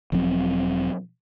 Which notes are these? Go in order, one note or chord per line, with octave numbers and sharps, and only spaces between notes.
E1 F3 F#3 C4